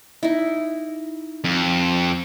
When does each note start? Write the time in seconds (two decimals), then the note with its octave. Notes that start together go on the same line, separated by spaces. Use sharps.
0.23 D#4 E4
1.44 F2